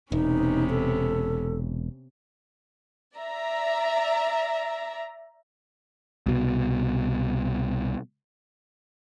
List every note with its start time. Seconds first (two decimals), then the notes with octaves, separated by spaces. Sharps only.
0.12 E1 C3 B3 C#4 D#4
0.70 A4
3.16 D5 E5 A#5
6.26 C2 B2